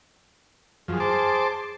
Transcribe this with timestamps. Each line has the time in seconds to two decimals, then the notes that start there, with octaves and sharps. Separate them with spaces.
0.88 F#2 F3 G#4
1.00 C5 A5 D6